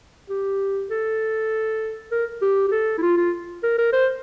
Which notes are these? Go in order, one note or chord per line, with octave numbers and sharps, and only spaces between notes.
G4
A4
A#4
G4
G4
A4
E4
F4
F4
A#4
A#4
C5